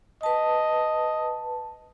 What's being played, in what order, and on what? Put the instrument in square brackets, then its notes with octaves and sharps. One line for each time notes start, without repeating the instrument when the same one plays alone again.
[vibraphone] B4 A5 [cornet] D#5